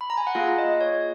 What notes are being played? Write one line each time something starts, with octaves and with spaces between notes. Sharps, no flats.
B5
A#5
G#5
F#5
A#3 F4 G#4 F5
D#5
C#5